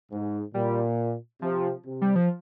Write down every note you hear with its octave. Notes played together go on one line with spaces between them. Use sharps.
G#2
A#2 G3
C3 F3
C3
G3
F3